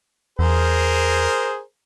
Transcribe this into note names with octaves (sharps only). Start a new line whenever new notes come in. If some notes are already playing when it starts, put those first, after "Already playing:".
E2 G#4 A#4 C5